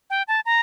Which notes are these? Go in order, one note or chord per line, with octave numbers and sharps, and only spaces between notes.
G5
A5
A#5